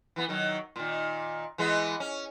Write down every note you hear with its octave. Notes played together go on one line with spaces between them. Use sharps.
E3 B3
D#3 F#3
A#2 D#3
E3 G#3 B3
C#4